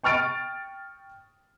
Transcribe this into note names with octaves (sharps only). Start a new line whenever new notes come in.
G5 C#6 F6 A6 D7